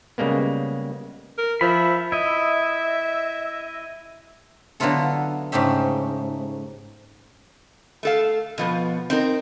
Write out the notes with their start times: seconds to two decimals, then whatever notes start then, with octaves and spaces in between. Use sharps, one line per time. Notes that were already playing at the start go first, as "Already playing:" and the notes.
0.18 C#3 G3 G#3 A#3 B3
1.38 A#4
1.61 F3 E5 B5
2.12 E4 D#5 E5
4.80 D3 F#3 B3 E4 F4 A4
5.52 G#2 C#3 A3 G4 E5
8.03 A3 A4 F5
8.58 B2 F3 B3
9.10 C4 D#4 A#4